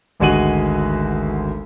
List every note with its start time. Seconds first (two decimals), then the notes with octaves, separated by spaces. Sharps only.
0.20 G#1 D2 G#3 F#4 D#7 F#7